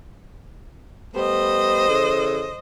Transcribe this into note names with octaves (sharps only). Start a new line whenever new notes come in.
G3 A3 B3 C5 D#5
C#3 E3 A4